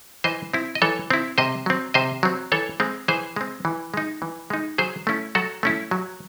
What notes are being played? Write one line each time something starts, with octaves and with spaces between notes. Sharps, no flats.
E3 C5 D#5
C4 E4
D#5
E3 A4 C#5
C4 E4
C3 C5 D#5
F#3 C4
C3 C5 D#5
F#3 C4
E3 A4 C#5
G#3 C4
E3 G#4 C5
G#3 C4
E3
G#3 D#4
E3
G#3 D#4
F#3 G#4 C5
A3 C#4 E4
F#3 F#4 A4
A3 C#4 E4
F#3